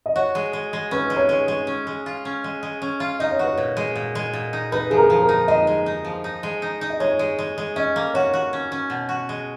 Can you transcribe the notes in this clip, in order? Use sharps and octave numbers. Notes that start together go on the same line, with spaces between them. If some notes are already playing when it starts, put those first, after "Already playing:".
D#5
F#4 C#5
G#3
G#3
G#3
C#4 B4
G#3
C#5
G#3
G#3
C#4
G#3
F4
C#4
G#3
G#3
C#4
F4
D#4 D#5
C#5
F#4 B4
A#2 C#5
G#3
A#2
G#3
A#2
D#4
D#4 B4
F3 G#4
A#4
F3
A#4
D#4
G#3 D#5
G#3
D#4
F3
D#4
G#3
D#4
D#4
D#5
G#3 C#5
G#3
G#3
G#3
C#4 D#5
A#3
F#4 C#5
F#4
C#4
C#4
B2
F#4
G#3